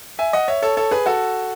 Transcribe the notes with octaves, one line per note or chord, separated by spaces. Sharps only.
E5 G#5
D#5 F#5
C#5 E5
A4 C#5
A4 C#5
G#4 B4
F#4 A4